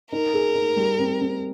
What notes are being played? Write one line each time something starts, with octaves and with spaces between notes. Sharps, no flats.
D#4 A#4
G#4
D#4
G3
C4
C4